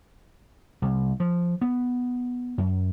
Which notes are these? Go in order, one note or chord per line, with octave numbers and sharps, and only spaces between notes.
C2
F3
B3
F#2